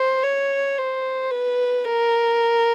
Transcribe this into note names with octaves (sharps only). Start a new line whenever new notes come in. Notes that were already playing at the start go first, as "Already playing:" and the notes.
Already playing: C5
C#5
C5
B4
A#4